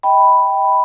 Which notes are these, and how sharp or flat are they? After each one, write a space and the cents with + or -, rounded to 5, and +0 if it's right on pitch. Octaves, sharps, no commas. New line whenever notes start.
D#5 +35 G5 +0 B5 +0